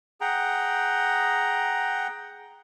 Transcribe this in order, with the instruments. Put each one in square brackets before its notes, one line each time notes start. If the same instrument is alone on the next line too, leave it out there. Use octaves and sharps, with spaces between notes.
[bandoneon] G#4 F#5 G5 A#5